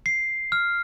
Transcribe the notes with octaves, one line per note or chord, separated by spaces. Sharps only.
C7
F6